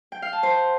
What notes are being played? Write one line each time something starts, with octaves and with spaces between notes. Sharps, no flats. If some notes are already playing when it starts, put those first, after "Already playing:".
G5
F5
A5
C5